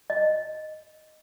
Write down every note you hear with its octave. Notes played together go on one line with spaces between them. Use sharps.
D#5